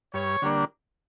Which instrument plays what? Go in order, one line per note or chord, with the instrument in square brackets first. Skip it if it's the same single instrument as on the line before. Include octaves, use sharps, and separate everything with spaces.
[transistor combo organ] G2 [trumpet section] C#5
[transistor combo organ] D3 G3 A#3 D4